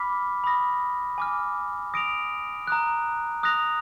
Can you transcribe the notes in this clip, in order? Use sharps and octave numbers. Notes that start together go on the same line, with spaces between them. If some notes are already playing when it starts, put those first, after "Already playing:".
Already playing: B5 D6 F6 B6
B5 D#6 A#6
G#5 D6 F6
D#6 A#6 D7 F7
A#5 D#6 F#6
D#6 F#6 A#6 F7